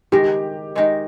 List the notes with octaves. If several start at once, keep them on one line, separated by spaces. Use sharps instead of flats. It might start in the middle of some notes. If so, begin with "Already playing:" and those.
D#3 G#3 D#4 G4 A#4
D#3 G#3 D#4 A#4